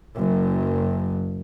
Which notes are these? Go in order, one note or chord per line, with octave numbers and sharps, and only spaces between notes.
F#1 F#2